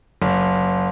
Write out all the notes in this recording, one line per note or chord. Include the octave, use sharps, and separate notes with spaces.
F#1